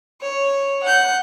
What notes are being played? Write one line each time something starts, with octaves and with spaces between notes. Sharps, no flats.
C#5
F#5 G6